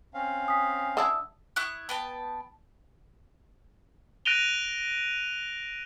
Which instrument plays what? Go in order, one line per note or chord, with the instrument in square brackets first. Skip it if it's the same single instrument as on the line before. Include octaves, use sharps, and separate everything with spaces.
[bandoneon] C4 C#4 F5
[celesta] G#5 D#6 B6
[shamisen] D3 E4 A5 [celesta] D#6 E6
[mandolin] E4 C#6 D#6 F#6
B3 G5 A5
[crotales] F#6 A#6 D7 D#7 F7 G7